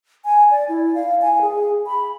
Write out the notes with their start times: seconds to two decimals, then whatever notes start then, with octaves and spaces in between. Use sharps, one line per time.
0.25 G#5
0.51 D5
0.69 E4
0.95 F5
1.22 G#5
1.41 G#4
1.87 B5